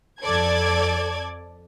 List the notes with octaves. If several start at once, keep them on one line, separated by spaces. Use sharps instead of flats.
F2 A4 D5 G#6